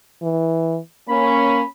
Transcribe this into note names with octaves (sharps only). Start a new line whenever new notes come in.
E3
A#3 C#4 B5